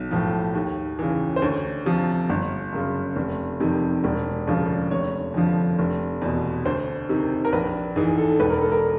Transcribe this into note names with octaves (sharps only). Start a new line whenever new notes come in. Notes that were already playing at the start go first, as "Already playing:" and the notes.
Already playing: B1
A2 F3
D#2
C#3 E3
C5
D2 C#5
C3 F3
G1
F#2 C#3
F1
F2 C3 D#3
E1
D2 C#3 F3
F1 C#5
F2 D3 F3
F1
E2 B2
D2 C5
C3 D#3
A#4
A#1 B4
G#2 E3 G#4
A4
E1 B4
A#4
A4
A#4